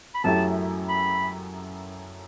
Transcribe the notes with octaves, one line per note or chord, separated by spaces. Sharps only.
B5
F#2 F#3 A3 E4 G4 A5
B5